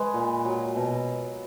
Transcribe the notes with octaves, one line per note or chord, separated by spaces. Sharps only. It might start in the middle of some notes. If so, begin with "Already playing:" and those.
Already playing: G#3 B4
A#2
F#3
B2